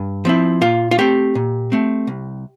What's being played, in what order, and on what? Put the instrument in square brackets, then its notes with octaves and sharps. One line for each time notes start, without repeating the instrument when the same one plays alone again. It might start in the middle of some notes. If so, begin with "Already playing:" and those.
Already playing: [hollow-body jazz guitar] G2
F3 C4 E4
A#2 F4
F4
A3 C4 G4
A#2
A3 C4
C2